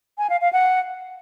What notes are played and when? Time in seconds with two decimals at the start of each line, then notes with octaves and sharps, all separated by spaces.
0.18 G#5
0.30 F5
0.41 F5
0.53 F#5